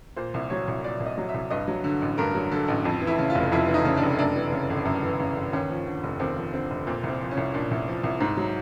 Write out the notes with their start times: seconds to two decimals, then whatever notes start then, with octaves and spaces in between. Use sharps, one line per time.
0.16 A#2 C5
0.34 C2
0.50 F#3 C#5
0.68 C2
0.84 A#2 D5
1.00 C2
1.06 D#5
1.18 F#3
1.29 E5
1.34 C2
1.50 G2 D#5
1.68 F#3
1.84 D3
2.02 A1
2.18 G2 A#4
2.34 F#3
2.52 D3 A4
2.68 A1
2.85 F2
3.02 E3
3.07 E4
3.18 C#3
3.30 F4
3.35 F1
3.52 F2 E4
3.68 E3
3.74 D#4
3.85 C#3
3.97 D4
4.03 F1
4.19 F#2 D4
4.36 E3
4.52 C#3
4.70 G1
4.85 F#2
5.03 E3
5.19 C#3
5.36 G1
5.53 D#2 C#4
5.70 F3
5.86 D3
6.03 F1
6.20 D#2 C4
6.37 F3
6.53 D3 C4
6.71 F1
6.87 A#2 C4
7.03 C2
7.09 C4
7.21 F3
7.31 C#4
7.37 C2
7.54 A#2 D4
7.71 C2
7.88 F3
8.04 C2
8.20 G#2
8.37 F#3